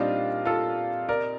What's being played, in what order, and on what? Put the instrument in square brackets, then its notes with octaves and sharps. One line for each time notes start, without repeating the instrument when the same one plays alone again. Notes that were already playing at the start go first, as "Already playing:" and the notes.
Already playing: [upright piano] A#2 G3 C4 D#4 [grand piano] D4 F4
[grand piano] F4 A4
A#4 D5